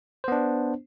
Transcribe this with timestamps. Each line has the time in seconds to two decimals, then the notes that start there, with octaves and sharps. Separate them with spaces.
0.24 C5
0.28 B3
0.32 D4